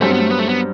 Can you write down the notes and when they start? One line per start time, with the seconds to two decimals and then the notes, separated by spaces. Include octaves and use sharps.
0.01 G2 F#3 A3 C4
0.11 B3
0.20 A3
0.30 B3
0.39 A3
0.49 B3